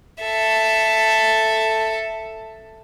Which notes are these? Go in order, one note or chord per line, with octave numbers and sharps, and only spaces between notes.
A4 E5